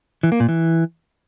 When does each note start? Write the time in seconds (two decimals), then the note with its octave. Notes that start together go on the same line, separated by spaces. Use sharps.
0.23 E3
0.32 A#3
0.40 A#2
0.49 E3